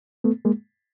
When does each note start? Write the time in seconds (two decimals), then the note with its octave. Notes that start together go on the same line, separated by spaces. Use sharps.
0.24 A3 B3
0.45 G#3 A#3